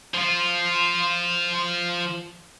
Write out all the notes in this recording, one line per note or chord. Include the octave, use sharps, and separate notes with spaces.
F3 F4